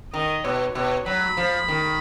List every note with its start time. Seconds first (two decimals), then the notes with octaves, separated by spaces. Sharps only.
0.13 D#3 D#5
0.44 B2 C#5
0.75 B2 C#5
1.06 F#3 B5
1.37 F3
1.68 D#3